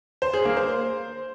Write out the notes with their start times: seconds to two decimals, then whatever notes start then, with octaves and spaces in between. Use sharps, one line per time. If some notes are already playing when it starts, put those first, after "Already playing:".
0.22 C5
0.33 G#4
0.45 A#3
0.57 C5